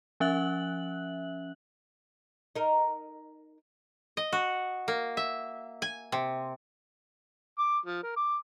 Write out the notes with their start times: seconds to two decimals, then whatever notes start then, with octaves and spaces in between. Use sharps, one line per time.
0.20 F3 C#4 E5 F#6 F#7
2.56 D#4 A#4
4.17 D#5
4.33 F#4
4.88 A#3
5.17 E5
5.82 G#5
6.12 C3
7.58 D6
7.85 F3
8.03 A#4
8.16 D6